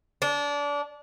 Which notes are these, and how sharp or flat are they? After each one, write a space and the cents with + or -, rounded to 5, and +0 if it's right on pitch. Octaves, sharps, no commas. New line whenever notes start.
D4 -25